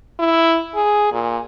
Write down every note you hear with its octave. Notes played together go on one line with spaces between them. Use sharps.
E4
G#4
A#2